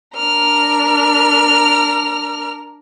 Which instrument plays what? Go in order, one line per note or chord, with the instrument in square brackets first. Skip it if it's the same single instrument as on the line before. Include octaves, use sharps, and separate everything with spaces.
[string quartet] D4 A#4 F6